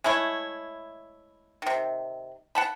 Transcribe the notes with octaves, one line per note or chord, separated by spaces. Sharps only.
G#3 A3 E4 C#5
C3 D#3
F#5 A5 B5